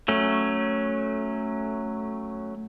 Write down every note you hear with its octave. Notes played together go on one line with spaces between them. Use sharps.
F#3 A3 C#4